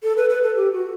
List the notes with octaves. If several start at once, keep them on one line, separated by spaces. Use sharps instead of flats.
A4
B4
B4
A4
G4
F#4